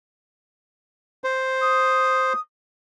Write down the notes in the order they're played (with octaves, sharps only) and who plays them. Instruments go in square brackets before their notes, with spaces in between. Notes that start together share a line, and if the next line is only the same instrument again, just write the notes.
[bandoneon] C5
[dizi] D#6